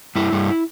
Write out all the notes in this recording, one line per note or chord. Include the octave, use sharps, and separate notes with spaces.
G2 E4
G2